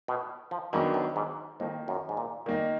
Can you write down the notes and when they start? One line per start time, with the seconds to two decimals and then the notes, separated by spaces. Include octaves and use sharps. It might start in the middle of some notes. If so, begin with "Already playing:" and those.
0.08 B2
0.51 F3
0.73 G#2 D#3 F#3 B3 D4
0.94 F#2
1.16 G#2
1.60 F2 D#3 A#3 D#4
1.88 F#2
2.09 G#2
2.17 A#2
2.46 A#2 D#3 A#3 D#4